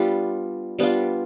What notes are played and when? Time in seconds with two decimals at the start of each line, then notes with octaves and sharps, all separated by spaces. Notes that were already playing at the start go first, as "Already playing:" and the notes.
Already playing: G3 B3 D4 F4
0.79 G3 B3 D4 F4